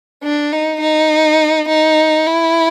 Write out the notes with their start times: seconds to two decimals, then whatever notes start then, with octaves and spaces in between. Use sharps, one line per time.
0.24 D4
0.52 D#4
0.81 D#4
1.68 D#4
2.27 E4